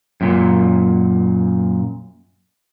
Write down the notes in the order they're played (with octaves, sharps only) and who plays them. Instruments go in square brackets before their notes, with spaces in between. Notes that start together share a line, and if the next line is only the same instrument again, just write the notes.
[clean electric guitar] F#2 A#2